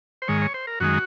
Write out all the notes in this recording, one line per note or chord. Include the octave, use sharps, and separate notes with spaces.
C5
G#2 D#3 G#3 C#5
C#5
C5
A#4
F#2 D#3 G#3 F#4